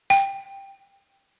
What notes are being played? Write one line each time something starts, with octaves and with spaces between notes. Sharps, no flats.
G5